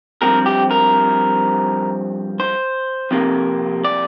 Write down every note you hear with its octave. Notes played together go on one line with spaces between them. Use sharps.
G2 F3 C4 A#4
G4
A#4
C5
F2 C3 A#3
D5